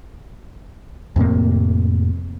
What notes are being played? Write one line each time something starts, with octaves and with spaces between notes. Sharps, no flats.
F2 A2 C3 A#3